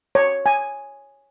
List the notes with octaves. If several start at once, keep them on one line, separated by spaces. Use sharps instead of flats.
C#5
G#5